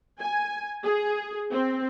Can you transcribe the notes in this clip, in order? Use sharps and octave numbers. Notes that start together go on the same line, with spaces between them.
G#5
G#4
C4